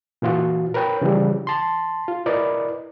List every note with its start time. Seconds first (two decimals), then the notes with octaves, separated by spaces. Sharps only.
0.22 A#2 E3 F4 F#4
0.74 A#4 B4 C#5 G5
1.02 C#3 E3 F3 G3
1.47 A5 C6
2.08 F4
2.26 E4 A#4 B4 D5 D#5